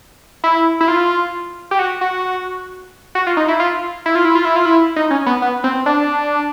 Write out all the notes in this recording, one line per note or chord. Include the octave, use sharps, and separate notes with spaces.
E4
E4
F4
G4
F#4
F#4
F#4
F4
D#4
E4
F4
E4
F4
E4
F4
E4
F4
E4
D#4
C#4
B3
B3
C4
D4